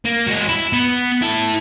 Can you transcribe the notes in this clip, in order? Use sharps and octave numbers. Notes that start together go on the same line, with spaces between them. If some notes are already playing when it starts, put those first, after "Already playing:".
A#3
G#3 F#4
E4
B3
E4 A4